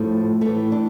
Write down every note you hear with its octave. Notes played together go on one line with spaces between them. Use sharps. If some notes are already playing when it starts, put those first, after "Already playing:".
Already playing: A2 F3 A3
A2 E3 A3
D4